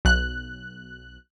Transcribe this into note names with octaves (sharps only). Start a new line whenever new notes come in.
B1 F#6